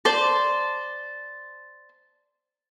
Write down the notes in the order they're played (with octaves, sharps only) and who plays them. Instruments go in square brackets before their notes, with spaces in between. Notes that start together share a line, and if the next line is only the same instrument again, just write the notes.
[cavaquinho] C5 D5 A5